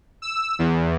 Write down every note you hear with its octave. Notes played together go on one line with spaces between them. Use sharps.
E6
E2